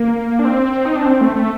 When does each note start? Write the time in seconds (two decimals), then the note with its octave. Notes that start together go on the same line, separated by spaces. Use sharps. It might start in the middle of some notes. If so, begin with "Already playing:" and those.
Already playing: A#3
0.39 D4
0.45 C4
0.85 D#4
0.96 D4
1.06 C4
1.21 A3
1.36 A3